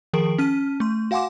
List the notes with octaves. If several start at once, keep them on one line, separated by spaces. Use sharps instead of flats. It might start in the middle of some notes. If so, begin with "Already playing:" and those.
D#3 F3 G#4 A#4 D7
C#4 A5 F6 D#7
A3 C6
F#4 F5 F#5 G#5 C6 D6